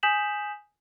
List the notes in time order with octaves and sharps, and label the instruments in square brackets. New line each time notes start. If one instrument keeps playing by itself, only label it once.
[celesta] G#5 D#6 G6 B6 E7 F#7